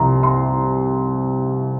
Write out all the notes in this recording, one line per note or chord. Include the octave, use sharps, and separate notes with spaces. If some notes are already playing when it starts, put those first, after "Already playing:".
Already playing: C2 C3 F3 A#5 C6
C6